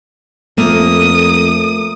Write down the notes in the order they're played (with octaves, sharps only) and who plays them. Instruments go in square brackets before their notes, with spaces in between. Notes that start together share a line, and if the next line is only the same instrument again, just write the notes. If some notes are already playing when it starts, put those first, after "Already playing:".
[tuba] F2 [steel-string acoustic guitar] A3 A#3 [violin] D#6